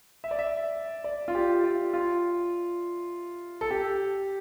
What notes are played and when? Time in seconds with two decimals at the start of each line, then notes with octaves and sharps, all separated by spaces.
0.24 E5
0.31 D5
0.39 E5
1.04 D5
1.28 F4
1.35 G4
1.64 F4
1.93 F4
3.61 A4
3.71 G4